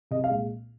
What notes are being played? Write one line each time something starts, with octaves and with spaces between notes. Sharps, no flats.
C2 D#5
F5
A#2 G#3